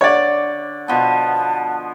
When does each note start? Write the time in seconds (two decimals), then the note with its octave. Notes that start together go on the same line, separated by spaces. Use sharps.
0.01 D3 C#5 D5
0.88 B2 F3 B3 A5